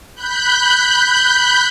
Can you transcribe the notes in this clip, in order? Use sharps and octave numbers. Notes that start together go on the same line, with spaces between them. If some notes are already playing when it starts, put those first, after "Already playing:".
B5 F#6 G6